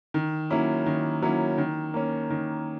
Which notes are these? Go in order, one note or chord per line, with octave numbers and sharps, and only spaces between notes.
D#3
F#3 A#3 C#4 E4
D#3
F#3 A#3 C#4 E4
D#3
A#3 C#4
D#3